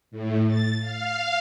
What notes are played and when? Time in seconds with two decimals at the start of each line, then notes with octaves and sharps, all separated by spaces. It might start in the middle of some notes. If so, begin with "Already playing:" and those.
0.11 A2
0.47 A6
0.80 F5